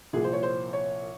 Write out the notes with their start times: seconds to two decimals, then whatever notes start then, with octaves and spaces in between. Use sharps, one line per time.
0.13 C2 A#2 F3 G#4
0.24 C5
0.33 C#5
0.43 C5
0.73 C#5